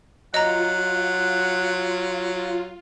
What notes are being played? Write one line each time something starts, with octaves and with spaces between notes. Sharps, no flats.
F#3 F4 D#5 F#5 A#5